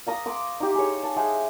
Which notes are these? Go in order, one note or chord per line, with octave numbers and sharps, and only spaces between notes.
F5 A#5 D#6
C6 D6 D#6
D#4 G4
G#4 C#5
A5
G#3 G#4 E5 G5